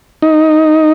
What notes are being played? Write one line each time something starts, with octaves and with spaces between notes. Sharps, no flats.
D#4